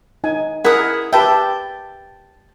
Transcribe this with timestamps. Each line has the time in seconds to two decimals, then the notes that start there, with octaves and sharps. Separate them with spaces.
0.24 D#4 G#5
0.65 E4 G#4 A#4 F#5 D#6
1.13 G4 B4 E5 G5 A5